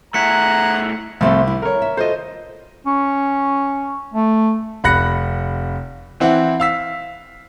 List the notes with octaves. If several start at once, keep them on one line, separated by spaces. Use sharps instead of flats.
A3 E4 G#4 F#5 A#5 B6 C#7
C2 F3 A3 C4
E4
A#4 C#5
E5
F4 F#4 A4 C5 D#5
C#4
A3
F1 B5 F#6 A#6 C#7
E3 C4 E4 F#5
F5 E6 B6